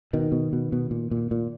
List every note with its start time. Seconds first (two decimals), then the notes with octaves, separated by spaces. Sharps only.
0.13 B2 D#3
0.32 B2
0.53 B2
0.72 B2
0.91 A#2
1.11 A#2
1.31 A#2